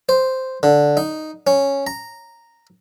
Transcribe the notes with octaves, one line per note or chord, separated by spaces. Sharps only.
C5
D3
D#4
C#4
A#5